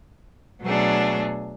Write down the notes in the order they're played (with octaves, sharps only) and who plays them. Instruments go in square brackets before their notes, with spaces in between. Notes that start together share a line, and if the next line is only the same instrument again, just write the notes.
[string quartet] B2 F#3 A3 D4 G#4